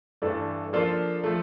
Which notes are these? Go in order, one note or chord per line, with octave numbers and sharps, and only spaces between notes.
G2 E3 A3 D4 A4
F3 A#3 D4 F4 A4
F3 A3